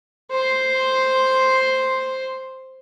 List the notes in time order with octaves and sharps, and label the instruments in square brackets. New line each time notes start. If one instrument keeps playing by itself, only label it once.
[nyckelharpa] C5 C6